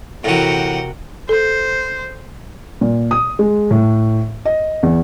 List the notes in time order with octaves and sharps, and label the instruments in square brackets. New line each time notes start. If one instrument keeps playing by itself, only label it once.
[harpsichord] A2 E3 [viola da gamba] C3 F#4 A#4 [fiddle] F#5 G5
[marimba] A4 [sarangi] C5
[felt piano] A#2
D#6
G#3
A2
D#5
E2